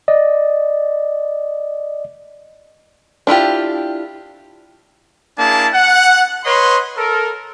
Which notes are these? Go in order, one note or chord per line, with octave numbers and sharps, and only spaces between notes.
D5 D#5
D4 E4 F4 G4
A#3 D4 E4 G#4 A5
F#5
B4 C#5 D#5 C6
A4 A#4